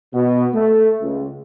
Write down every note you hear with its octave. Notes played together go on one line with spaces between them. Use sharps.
B2
A3
C#2